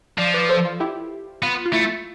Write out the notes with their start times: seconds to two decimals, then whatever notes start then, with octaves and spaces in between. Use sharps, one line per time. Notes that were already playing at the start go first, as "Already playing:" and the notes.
0.18 F3 D5 F5
0.34 B4 D5
0.49 A4 C5
0.65 F4
0.80 E4 G4
1.42 B3 F4
1.66 F4
1.73 A3 E4